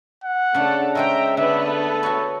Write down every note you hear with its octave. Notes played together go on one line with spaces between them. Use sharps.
F#5
C#3 A3 D4 A4
C#3 G#3 C5 E5 G5 A#5
D3 A3 B3 B4 E5
A4
F#4 C#5